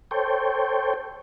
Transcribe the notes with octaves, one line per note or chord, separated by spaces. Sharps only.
A4 C5 C#5 G5